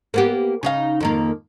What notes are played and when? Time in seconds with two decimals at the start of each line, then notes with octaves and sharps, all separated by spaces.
0.14 A#3 B3 G4
0.63 C#3 D#4 F5
1.01 F2 D#3 A#3